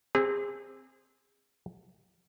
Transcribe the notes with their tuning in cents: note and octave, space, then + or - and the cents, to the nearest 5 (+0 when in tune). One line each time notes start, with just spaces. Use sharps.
C4 +5 G#4 -30